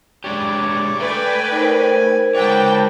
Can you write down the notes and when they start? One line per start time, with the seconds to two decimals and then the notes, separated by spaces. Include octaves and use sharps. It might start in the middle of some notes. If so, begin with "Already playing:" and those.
0.24 G#3 D4 G4 C#5 D5
1.00 A3 B4 D5 G5 G#5
1.52 D#4 A#4 C5
2.35 G#3 F#4 B4 C#5 D5 G5 A5